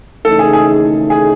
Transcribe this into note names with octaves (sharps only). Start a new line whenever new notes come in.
D#2 C#3 E3 A3 D#4 A4
G#4
G#4
G#4